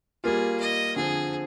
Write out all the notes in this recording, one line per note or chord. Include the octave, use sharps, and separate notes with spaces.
G3 A#3 F4 G#4
D#5
D3 F3 C4 G#4